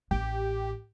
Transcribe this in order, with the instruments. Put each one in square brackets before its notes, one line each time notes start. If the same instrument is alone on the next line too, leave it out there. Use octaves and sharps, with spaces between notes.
[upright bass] A1 [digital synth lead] G4